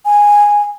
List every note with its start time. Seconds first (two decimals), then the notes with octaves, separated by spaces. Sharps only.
0.05 G#5